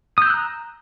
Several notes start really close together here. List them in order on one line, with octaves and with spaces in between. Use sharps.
D#6 G6 E6 F#6 A#5